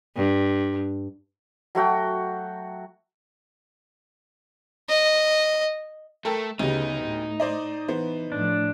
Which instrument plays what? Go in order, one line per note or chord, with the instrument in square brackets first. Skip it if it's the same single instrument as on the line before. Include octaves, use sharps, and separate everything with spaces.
[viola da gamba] G2
[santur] F#3 A3 F#4 G5
[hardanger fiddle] D#5
[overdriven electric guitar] A3 [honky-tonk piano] A4 A#4 G5
[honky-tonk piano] D2 G4 [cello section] C#3 B3 [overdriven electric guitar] D#4
[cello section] A2
[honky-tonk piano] C5 D5 D#5
[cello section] E3 [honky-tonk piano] B3 C5
[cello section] A2 F3 [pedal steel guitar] D4